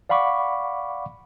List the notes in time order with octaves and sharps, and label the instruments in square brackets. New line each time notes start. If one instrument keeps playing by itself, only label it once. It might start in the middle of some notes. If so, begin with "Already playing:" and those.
[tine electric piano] D5 F5 F#5 B5 C#6 D6